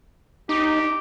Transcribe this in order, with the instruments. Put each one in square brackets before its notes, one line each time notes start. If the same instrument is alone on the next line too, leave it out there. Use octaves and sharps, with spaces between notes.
[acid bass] D#4 [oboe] G4